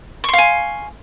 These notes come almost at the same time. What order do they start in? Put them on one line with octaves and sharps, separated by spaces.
C#6 C6 F5 G#5